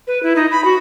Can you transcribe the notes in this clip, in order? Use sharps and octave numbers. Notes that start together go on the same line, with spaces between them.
B4
E4
D#4
B5
F#4